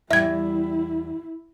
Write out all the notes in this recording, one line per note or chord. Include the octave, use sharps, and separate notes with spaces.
E2 G3 E4 E5 G#6